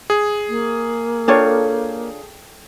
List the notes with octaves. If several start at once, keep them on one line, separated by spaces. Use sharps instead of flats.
G#4
A#3
D4 F4 A4 C#5 G5